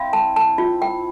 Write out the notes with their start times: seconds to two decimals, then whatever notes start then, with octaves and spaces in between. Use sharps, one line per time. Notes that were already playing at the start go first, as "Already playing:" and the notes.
Already playing: C4 E4 F5
0.13 A5
0.36 A5
0.58 F4
0.82 G5